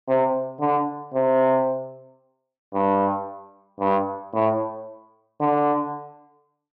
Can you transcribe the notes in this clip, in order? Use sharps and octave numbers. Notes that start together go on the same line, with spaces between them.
C3
D3
C3
G2
G2
A2
D3